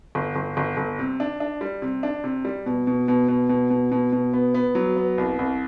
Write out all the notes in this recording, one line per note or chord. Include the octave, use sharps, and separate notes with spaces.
G1
G1
G1
G1
C3
D4
D4
G3
C3
D4
C3
G3
B2
B2
B2
B2
B2
B2
B2
B2
B3
B3
F#3
B3
C2
C2